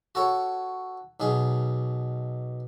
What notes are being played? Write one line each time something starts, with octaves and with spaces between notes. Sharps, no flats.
F#4 A4 C#5
B1 B2 G#4